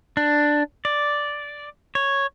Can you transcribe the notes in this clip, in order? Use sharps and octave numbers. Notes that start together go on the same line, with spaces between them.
D4
D5
C#5